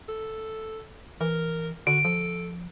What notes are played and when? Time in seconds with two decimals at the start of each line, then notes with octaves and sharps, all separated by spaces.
0.09 A4
1.21 E3 A#4
1.87 D3 F#4 D7
2.05 F3 A4